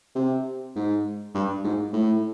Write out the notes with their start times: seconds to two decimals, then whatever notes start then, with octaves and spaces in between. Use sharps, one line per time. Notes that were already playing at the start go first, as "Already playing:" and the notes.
0.15 C3
0.76 G#2
1.34 G2
1.64 G#2
1.93 A2